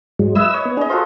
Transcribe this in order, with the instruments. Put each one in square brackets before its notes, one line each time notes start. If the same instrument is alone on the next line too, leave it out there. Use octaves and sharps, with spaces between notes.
[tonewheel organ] G#2 F#3 G#3
[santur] E4 B4 D#5 [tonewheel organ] E6
[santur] C#5 D#5
[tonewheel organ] B3
[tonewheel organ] D4 [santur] G#4 D#5
[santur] F4 F#4 A4 [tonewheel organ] C5